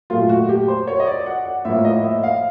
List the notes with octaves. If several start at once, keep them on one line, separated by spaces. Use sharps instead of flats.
A#2 F#3 A3 F4
F#4
G4
C5
C#5
D#5
D5
F#5
F#5
A2 F3 A#3 E5
D#5
E5
F5